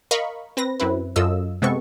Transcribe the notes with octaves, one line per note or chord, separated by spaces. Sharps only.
A#4 D#5 F5 B5 C#6
C4 B4 A#6
F#2 C4 E4 B4
F#2 F4 A4 D#5 E6
C3 G#3 B3 C4 A4 C#6